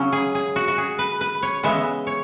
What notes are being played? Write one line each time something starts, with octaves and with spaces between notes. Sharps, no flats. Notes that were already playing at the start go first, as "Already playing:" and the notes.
Already playing: C#3 F#3 C#4
G#4
G#4
F#4
F#4
G#4
B4
B4
C#5
C#3 E3 G#3 B3 E5
C#5